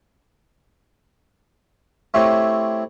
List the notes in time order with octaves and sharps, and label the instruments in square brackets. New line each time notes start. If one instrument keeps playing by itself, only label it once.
[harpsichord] A3 C4 E4 G4 C#5